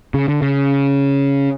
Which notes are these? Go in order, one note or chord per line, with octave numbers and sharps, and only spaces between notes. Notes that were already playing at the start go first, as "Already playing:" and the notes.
C#3
D3
C#3